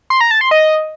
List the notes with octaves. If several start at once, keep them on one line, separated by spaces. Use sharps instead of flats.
C6
A#5
A5
C6
D#5